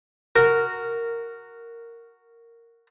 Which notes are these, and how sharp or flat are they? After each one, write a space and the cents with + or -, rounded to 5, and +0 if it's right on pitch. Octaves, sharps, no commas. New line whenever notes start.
F#4 +0 A#4 -10